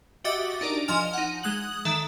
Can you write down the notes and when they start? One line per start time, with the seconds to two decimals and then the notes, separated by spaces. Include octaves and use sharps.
0.24 F#4 G4 D#5 E5 D6 A6
0.61 D4 D#4 A#4 D5
0.88 F3 D#5 G#5 F6 F7
1.14 D#4 F#5
1.43 G#3 D#6 F#6 F#7
1.85 D#3 A4 E5